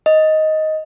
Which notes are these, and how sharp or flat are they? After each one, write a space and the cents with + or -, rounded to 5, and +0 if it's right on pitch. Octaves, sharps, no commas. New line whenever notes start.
D#5 +10